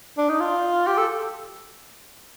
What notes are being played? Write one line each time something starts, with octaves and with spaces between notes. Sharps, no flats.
D4
D#4
F4
G4
A4